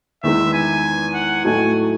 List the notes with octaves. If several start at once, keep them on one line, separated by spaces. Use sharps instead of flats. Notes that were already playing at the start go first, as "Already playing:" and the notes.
E2 D#3 G#3 B3 E5
G#5
F#5
A2 F#3 A3 D#4 A4 G#5